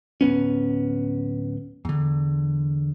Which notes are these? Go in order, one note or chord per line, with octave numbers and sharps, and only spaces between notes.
D1 G#1 B3 C#4
E2 D3